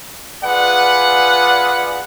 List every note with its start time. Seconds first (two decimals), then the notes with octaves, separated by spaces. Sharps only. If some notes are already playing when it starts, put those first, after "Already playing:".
0.43 F4 G#4 B4 D5 F#5